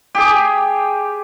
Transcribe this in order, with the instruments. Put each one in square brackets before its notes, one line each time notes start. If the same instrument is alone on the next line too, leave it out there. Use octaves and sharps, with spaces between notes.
[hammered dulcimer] G4 G#4